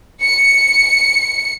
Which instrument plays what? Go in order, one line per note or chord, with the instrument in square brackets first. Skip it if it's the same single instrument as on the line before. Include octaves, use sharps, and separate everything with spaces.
[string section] C#7